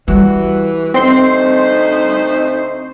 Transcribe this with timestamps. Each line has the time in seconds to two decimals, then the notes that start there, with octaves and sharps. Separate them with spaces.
0.08 E3 G3 F#4
0.94 D2 A3 C4 D#4 C5 C6 C7